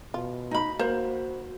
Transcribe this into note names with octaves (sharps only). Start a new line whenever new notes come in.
B2 F4
D#4 B5
A#3 F#4 C5